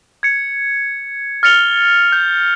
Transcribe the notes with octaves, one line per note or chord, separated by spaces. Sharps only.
G#6 C#7
F6 A6 C#7 F7 G7
G6